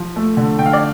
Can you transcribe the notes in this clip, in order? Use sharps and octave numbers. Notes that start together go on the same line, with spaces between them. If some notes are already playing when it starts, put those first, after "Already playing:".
Already playing: F3
A3
D3
D3 G5
F5
D5